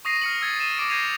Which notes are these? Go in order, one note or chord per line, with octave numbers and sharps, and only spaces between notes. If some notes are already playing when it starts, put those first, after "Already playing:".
C#6 D#6 A#6 C7 D#7
F6 C#7 F#7
E6 G#6 A6
G#6 D#7 E7
D6 A#6 D7
G6 G#6 A#6 C7 D#7 F7